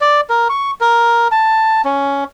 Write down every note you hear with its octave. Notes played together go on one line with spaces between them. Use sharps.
D5
A#4
C#6
A#4
A5
C#4